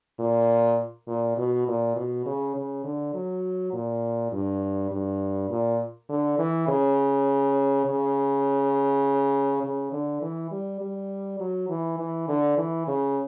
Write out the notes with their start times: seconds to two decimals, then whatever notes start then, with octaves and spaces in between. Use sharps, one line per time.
0.19 A#2
1.08 A#2
1.37 B2
1.67 A#2
1.96 B2
2.26 C#3
2.55 C#3
2.84 D3
3.14 F#3
3.73 A#2
4.32 G2
4.91 G2
5.50 A#2
6.09 D3
6.38 E3
6.68 C#3
7.86 C#3
9.63 C#3
9.93 D3
10.22 E3
10.51 G3
10.81 G3
11.40 F#3
11.69 E3
11.98 E3
12.28 D3
12.58 E3
12.87 C#3